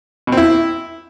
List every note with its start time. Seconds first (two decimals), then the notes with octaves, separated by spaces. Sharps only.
0.27 B2
0.32 C4
0.37 E4